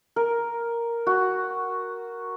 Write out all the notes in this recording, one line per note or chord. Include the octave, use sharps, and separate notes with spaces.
A#4
F#4